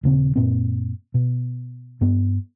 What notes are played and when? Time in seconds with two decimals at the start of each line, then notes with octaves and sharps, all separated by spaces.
0.03 D#1 C#3 C4
0.36 F#2 A#2 C4
1.14 B2
2.01 G2 B3